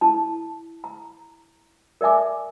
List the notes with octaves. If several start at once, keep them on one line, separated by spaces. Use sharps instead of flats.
E4 A5
A#5
A#4 D5 E5 G#5 D6